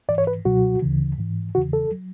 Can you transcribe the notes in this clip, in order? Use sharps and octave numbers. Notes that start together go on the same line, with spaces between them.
G#2 E3 D5
C#5
B4
C#2 B2 F#3 F#4
D2 C#3 E3
G#2 E3
E2 C#3 E3 F#4
A4
F#3